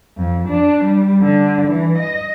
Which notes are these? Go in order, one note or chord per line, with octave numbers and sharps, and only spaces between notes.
F2
D4
G3
D3
E3
D#5